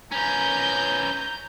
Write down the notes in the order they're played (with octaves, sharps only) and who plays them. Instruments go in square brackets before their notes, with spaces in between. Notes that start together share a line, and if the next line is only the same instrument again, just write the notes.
[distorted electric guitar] B3 C#4 [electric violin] A#5 G6